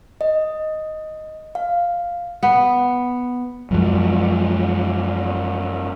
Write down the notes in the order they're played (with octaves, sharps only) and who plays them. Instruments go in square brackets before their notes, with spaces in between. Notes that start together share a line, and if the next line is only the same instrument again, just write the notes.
[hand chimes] D#5
F5
[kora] B3
[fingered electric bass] F#2 F3 G#3